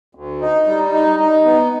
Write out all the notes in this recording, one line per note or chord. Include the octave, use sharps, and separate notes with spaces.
D2
D#4
G3
D#4
D#4
B3